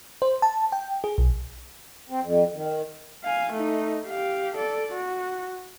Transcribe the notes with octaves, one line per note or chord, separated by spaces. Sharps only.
C5
A5
G5
G#4
B1
C4
F2
D#3
F5 G#5
A3 D#4
G4 F5
A4 D5
F#4